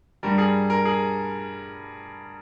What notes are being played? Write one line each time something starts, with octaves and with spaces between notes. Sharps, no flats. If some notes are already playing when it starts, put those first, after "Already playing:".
G2 G3 A#4
G#4
A#4
G#4